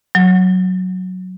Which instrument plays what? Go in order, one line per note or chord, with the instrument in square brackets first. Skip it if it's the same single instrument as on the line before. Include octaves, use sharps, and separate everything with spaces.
[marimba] F#3